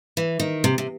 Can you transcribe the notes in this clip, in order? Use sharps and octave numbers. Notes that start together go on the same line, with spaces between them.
E3
D#3
C3
C3